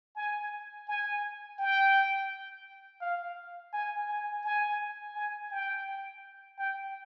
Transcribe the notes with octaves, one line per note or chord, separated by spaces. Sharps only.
G#5
G#5
G5
F5
G#5
G#5
G#5
G#5
G5
G5